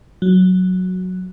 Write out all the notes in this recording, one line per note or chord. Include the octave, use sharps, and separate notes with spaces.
F#3